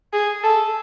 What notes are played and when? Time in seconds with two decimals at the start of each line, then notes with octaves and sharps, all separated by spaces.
0.13 G#4
0.43 A4